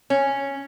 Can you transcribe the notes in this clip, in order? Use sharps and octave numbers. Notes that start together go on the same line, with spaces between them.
C#4